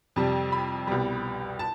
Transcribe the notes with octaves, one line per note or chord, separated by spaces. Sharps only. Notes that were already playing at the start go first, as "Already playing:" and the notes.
F2 C3 G3 A5
B5
C2 B2 G3
A5